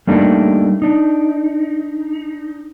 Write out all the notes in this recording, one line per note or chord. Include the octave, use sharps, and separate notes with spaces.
G3 A3 A#3 D4 D#4
D4 D#4